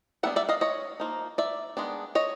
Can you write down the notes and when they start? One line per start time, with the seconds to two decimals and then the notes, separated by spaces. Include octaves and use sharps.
0.23 G3 B3 D4 E5 F#5
0.36 D5 E5
0.49 D#5 F5
0.61 C#5 D#5
1.00 F3 A#3 D#4
1.38 D5 E5
1.77 D#3 G#3 B3 D4
2.15 C#5 D#5